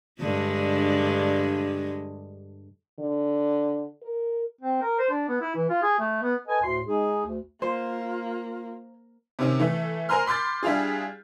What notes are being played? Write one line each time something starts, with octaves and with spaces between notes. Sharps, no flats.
G2 D3 G#3
D3
A#4
C4
A#4
C5
D4
B3
E4
E3
F4
G#4
A3
B3
A4 B4 D#5 G#5
D2 A2 C6
G#3 D#4 G#4
D2
A#3 F4 C5
C3 D#3 C4 C#4
E3 A3
A#4 C5 G#5 A#5 C6 F6
B5 C6 D6 G6 A6
G3 D4 E4 F4 G#4